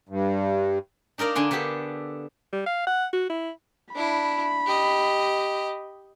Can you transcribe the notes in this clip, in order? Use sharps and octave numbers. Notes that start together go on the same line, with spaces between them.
G2
D4 D#4 A#4 D5 F5
D3 D4 G#5 C6
D3 B3 D4 G4 A4
G3
F5
F#5
F#4
E4
D4 E4 B5
G4 D#5